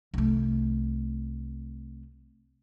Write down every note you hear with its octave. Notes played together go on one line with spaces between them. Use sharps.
C2 A3